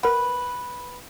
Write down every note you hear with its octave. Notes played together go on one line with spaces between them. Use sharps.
A#4 B4 F#5